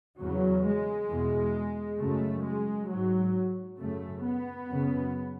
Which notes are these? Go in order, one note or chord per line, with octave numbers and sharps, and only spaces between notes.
E2 C#3 F#3
G#3
E2 B2
F#2 C#3 A3
G#3
G#2 F#3
F#2 C#3 A3
B3
F#2 C#3